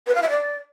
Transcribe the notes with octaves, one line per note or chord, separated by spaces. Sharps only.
B4
F5
E5
D5